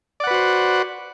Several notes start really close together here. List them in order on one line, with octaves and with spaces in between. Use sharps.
D5 F#5 B4 F#4 C5